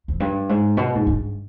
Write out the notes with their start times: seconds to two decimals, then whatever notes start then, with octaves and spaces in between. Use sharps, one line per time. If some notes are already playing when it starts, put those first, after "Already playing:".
0.08 F2
0.20 G2
0.49 G#2
0.77 B2
0.95 G#2
1.07 G2